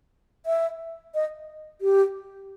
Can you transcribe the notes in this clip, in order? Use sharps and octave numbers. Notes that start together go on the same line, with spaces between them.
E5
D#5
G4